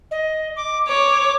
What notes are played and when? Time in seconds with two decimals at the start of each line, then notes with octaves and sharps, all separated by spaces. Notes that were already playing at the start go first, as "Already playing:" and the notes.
0.11 D#5
0.56 D6
0.88 C#5 D6